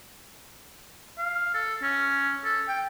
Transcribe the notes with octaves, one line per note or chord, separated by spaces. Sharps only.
F5
A4
C#4
A4
G5